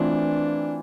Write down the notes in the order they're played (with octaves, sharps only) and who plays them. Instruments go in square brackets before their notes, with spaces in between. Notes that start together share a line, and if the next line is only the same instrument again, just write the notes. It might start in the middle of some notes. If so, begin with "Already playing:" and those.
Already playing: [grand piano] E3 A3 C4 F4 [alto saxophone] D4